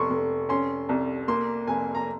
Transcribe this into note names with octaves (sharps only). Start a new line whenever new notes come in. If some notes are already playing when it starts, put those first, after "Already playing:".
Already playing: F1 C6 C#6
F1
C#4 C6
C2
A#3 C6
F1 G#5
A#5